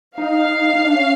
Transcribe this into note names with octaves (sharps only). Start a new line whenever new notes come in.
D#4 F5
D#4
D4
C#4